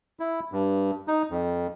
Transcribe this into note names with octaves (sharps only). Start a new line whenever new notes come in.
E4
G2
D#4
F2